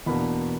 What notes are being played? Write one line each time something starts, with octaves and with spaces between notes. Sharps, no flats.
E2 B2 A#3 D4 B5